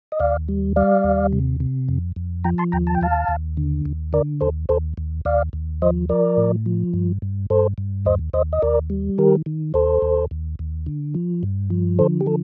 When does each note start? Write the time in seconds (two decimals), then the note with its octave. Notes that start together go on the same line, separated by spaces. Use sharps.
0.12 D#5
0.20 D#2 D5 F5
0.48 G3
0.76 G3 D5 F5
1.04 D#2
1.33 C3
1.60 C3
1.89 F2
2.16 F2
2.44 F3 G5 A#5
2.58 A5 C6
2.72 D#2 G5 A#5
2.87 A5
2.95 G5
3.01 D#2 F5 A5
3.28 D#2
3.57 D3
3.86 D#2
4.13 D3 A#4 D5
4.41 D#2 A4 C5
4.69 D#2 A4 C5
4.97 D#2
5.25 D#2 D5 F5
5.53 D#2
5.82 F3 C5 D#5
6.09 F3 A#4 D5
6.37 A2
6.66 F3
6.94 G2
7.22 G2
7.50 G2 A4 C5
7.78 G2
8.05 D#2 C5 D#5
8.33 D#2 C5 D#5
8.53 D#5
8.62 D#2 A#4 D5
8.90 G3
9.18 D#3 G4 A#4
9.46 D#3
9.74 D#2 A4 C5
10.02 D#2
10.31 D#2
10.59 D#2
10.86 D3
11.14 F3
11.43 G2
11.70 F3
11.99 D3 A4 C5
12.21 G4
12.26 F3 A4